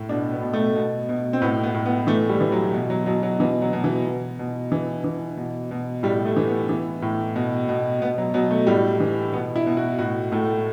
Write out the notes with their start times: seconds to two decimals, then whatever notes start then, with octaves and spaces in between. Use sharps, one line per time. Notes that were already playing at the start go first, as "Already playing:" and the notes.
Already playing: A2
0.09 B2 D4
0.32 B3
0.42 B2
0.53 A3
0.75 B2
1.09 B2
1.33 C4
1.42 A2 B3
1.63 B3
1.74 A2
1.86 B3
2.07 E3 A3
2.29 G3
2.41 E3
2.52 F#3
2.73 B2
2.90 F#3
3.06 B2 F#3
3.23 F#3
3.40 B2 E3
3.62 F#3
3.73 B2
3.84 E3
4.05 B2
4.39 B2
4.72 E3
5.04 E3
5.37 B2
5.71 B2
6.03 A2 G3
6.26 A3
6.36 E3
6.48 B3
6.69 E3
7.02 A2
7.36 B2
7.68 B2
8.01 B2 B3
8.18 F#3
8.34 B2 F#3
8.51 A3
8.67 A2 G3
9.00 E3
9.33 B2 B3
9.56 E4
9.67 B2
9.77 F#4
9.99 A2 F#4
10.32 A2 A3